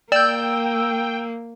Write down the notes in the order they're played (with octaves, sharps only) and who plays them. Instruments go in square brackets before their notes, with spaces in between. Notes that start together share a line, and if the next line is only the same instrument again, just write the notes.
[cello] A#3 [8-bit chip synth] D5 G6 [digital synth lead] G5 [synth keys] E6